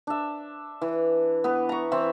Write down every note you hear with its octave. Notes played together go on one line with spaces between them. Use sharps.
D4 E5
E3
B3 E4 B4
A#5 C#6
E3 C4 E5 B5